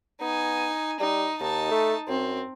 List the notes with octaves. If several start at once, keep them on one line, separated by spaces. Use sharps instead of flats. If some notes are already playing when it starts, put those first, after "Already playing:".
B3 D#4 G#5
G3 D#4
D#2 D#4 A5
A3
F#2 C4